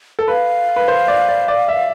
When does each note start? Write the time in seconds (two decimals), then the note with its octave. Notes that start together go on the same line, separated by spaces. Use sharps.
0.19 A4
0.28 B4 F5
0.76 B4
0.88 C5
1.08 D5
1.29 D5
1.48 D5
1.68 E5